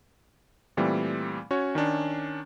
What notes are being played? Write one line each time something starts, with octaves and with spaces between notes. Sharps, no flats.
A#2 E3 G3 A3 C4
C#4 F#4 C#5
D#3 C#4 D4